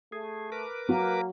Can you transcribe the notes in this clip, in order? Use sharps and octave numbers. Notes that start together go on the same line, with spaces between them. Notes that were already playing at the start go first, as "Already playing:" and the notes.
A3 G#4
A#4 B4 D6
F#3 A#3